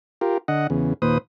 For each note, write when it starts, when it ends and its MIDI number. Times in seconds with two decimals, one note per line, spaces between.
0.21 0.38 65
0.21 0.38 67
0.21 0.38 70
0.48 0.67 50
0.48 0.67 75
0.48 0.67 78
0.70 0.93 40
0.70 0.93 49
1.02 1.18 39
1.02 1.18 46
1.02 1.18 71
1.02 1.18 72
1.02 1.18 87